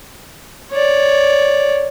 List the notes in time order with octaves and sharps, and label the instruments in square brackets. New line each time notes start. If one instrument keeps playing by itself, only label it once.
[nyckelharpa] C#5 D5